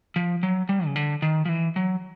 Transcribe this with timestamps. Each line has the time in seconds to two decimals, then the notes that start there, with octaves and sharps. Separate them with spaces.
0.16 F3
0.43 F#3
0.69 G3
0.86 C#3
0.96 D3
1.22 D#3
1.45 F3
1.49 E3
1.76 F#3